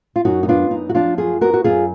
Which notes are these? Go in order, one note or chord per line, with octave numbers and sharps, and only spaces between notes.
F4
F#2 D#4 F#4
D#4
B3 D4 F4
F#2 D#4
F#4
F3 D4 F4
F#2 F4 G#4
B3 F#4 A#4
F#4
F#2 F4 G#4